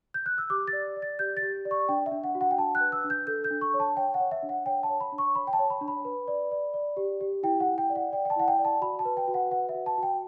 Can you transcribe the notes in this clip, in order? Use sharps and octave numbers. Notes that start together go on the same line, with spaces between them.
G6
F#6
E6
G4 D6
A6
D5
D5
A6
G4 G6
A6
G4
D5
C#6
D4 G5
E5
D4
F#5
F#4
F#5
G5
D4 A5
F#6
B4
E6
D4
G6
A4 G6
G6
D4
C#6
C#5
A5
C#5 G5
F#5
C#5
E5
D4
F#5
C#5 G5
A5
C#5
B5
D4
C#6
C#5 B5
G5
A5
C#5
B5
D4
B5
B4
D5
D5
D5
G4
G4
E4 G5
F#5
E4
G5
D5
F#5
D5 G5
G5
A5
E4 F#5
G5
D5
A5
F#4 B5
A5
B4
G5
F#4
F#5
B4 F#5
E5
F#4
A5
F#4
G5